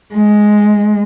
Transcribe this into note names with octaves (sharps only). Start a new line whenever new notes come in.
G#3